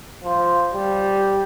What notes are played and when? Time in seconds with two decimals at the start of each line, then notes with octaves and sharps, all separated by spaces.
0.24 F3
0.74 G3